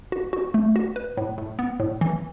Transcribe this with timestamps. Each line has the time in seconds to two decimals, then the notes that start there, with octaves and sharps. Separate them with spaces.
0.12 F#4
0.33 F#4
0.54 A3
0.76 F#4
0.96 B4
1.17 A2
1.38 A2
1.59 B3
1.80 A2
2.01 E3